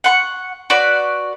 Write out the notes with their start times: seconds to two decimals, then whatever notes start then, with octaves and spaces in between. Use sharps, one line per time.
0.04 F#5 C6 C#6
0.70 F#4 B4 D5